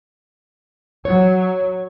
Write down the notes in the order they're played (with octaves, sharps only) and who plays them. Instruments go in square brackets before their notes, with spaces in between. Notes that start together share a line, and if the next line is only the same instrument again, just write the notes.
[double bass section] F#3 [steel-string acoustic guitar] C#5